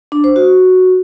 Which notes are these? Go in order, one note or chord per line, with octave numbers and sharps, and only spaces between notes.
D4
C5
F#4